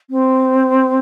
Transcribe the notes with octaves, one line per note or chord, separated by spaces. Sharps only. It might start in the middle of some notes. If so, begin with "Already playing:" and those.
C4